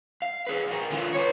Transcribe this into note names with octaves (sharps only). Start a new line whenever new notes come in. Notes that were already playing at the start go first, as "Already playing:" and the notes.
F5
G#4 B4
F3 A#4
D3 F4
B4 C#5